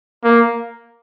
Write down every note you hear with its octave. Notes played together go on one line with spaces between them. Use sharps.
A#3